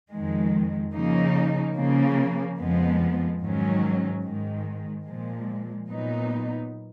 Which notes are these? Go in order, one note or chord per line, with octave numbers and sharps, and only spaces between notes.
F2 D#3 G#3
C#3 F3 A#3 D#4
C#3 F3 A#3
F2 F3 G#3 B3
G#2 D#3 F#3 C#4
G#2 D#3 G#3
A#2 F3 G#3
A#2 F#3 B3 D#4